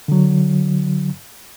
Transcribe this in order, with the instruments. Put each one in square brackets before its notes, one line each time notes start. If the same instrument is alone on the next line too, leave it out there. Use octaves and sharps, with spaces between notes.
[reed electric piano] D3 F#3